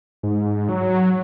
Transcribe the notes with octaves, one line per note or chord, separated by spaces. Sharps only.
G#2
F#3